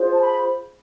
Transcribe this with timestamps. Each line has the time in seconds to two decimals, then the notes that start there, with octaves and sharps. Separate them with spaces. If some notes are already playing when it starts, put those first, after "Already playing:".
Already playing: F4 G#4 C5
0.13 A5
0.22 B5